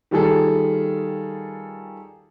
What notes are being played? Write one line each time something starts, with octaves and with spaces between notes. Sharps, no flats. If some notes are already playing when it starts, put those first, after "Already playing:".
D#3 G3 F4 G#4 A4